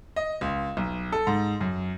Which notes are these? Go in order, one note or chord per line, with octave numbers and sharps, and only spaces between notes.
D#5
C#2
B1
A4
G#2
F#2